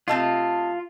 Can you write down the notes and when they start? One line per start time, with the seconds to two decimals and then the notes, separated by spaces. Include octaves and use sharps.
0.08 C3 A3 F4 D#5